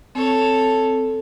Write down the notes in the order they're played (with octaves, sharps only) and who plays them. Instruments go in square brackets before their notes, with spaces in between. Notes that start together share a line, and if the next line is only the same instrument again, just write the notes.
[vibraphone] C4 [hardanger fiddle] A4 C#5